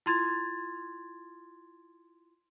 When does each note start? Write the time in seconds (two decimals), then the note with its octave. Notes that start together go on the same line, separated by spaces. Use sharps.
0.06 E4 F4 C6 G#6 A6